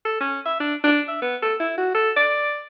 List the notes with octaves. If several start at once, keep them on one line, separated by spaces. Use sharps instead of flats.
A4
C#4
E5
D4
D4
E5
B3
A4
E4
F#4
A4
D5